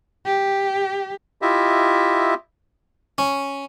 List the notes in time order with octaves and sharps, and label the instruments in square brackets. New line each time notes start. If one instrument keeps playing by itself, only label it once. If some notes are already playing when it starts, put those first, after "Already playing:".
[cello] G4
[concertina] E4 F4 G4 D#5 E5
[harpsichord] C#4